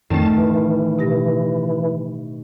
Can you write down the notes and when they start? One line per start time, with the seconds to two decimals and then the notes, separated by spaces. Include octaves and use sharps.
0.10 F2 A2 D#3 A3 C#4 A5
0.37 E3
0.99 B2 G4 A#6